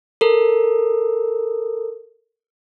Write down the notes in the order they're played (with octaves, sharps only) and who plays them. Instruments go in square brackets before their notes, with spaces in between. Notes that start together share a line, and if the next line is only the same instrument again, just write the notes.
[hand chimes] A4 A#4